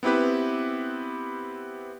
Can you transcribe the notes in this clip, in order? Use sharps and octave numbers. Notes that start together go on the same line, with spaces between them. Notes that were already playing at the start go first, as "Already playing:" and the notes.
B3 C4 E4 G4 B4